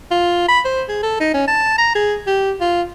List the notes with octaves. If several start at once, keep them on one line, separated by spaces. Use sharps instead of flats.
F4
B5
C5
G#4
A4
D#4
C#4
A5
A#5
G#4
G4
F4